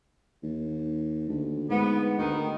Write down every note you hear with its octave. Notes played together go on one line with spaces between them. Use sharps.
D#2
D2
G#2 B3
D2 D#3